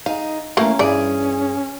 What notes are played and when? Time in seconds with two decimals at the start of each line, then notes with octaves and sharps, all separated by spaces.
0.06 D#4 G#4 F5
0.57 E3 A3 A#3 C#4 F5 F#5 A#5
0.79 G2 E3 G#4 D5